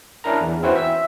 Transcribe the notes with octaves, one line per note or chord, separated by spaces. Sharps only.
C#4 D4 E4 A#4 A#5
E2
C4 C#4 E4 F#4 B4 C5
E5 E6